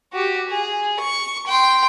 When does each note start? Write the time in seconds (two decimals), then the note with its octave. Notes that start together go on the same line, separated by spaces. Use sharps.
0.13 F#4 G4
0.49 G#4
1.00 C#6
1.47 G5 C6